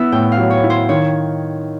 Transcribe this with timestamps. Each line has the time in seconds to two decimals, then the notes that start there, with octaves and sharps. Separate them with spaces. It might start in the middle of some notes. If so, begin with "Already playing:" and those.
Already playing: B3 E4 E5
0.12 A2 G5
0.32 F5
0.38 F#3
0.50 C#5
0.64 E4
0.70 C5
0.89 D#3 C#5